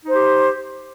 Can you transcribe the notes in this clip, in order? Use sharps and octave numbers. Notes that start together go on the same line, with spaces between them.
D#4 G4 C5